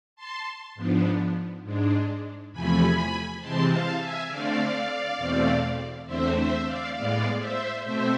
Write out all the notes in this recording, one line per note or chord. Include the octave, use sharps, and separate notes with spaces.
A5 C6
G#2 F3 B3 D4
G#2 G#3 D4
E2 C3 F3 A3 G#5 B5
C3 E3 G#3 C4 A5 C6
F5 A5
E5 G#5
D3 A3 C4 D5 F5
E2 B2 A3 C4
E2 D3 A3 C4 C5 E5
C5 E5
D5 F5
A2 G#3 B3 D5 F5
C5 E5
B2 A3 C4 C5 E5